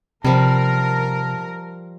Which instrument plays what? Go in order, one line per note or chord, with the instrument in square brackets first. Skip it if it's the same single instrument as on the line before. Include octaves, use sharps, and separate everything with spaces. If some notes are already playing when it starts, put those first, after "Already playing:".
[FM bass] C3 [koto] F3 G3 [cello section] A#4 [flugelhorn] A5